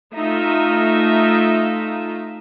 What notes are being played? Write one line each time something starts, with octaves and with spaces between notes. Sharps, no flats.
A3 D#4 F4 E5